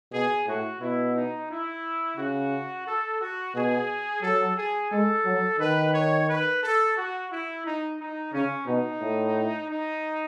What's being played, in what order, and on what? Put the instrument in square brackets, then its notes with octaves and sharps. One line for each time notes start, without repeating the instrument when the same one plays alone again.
[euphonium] B2 [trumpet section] G#4
[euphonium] A2 [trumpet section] F#4
[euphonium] B2 [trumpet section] E4
[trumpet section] D#4
E4
[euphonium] C#3 [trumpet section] F#4
[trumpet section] A4
F#4
[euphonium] B2 [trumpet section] G#4
[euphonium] F#3 [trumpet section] A4
[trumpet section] G#4
[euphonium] G#3 [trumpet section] A4
[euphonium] F#3
[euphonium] D#3 [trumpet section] B4
[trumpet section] C#5
B4
A4
F#4
E4
D#4
D#4
[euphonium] C#3 [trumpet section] C#4
[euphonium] B2 [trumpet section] D#4
[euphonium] A2
[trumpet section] D#4